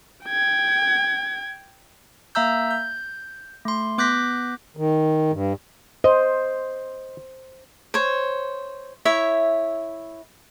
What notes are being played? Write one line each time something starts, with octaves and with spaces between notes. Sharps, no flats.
G5 G#6
A#3 E5 A#5 E6 G6
G6
A3 C6
B3 D6 F#6 G6 A#6 B6
D#3
G2
C5 D#5
C5 C#5
E4 C#5 E5